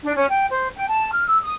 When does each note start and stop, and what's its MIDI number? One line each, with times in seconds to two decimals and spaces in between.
0.03 0.14 62
0.16 0.27 61
0.29 0.45 79
0.50 0.67 72
0.75 0.87 79
0.88 1.12 81
1.12 1.24 89
1.27 1.38 88
1.43 1.54 87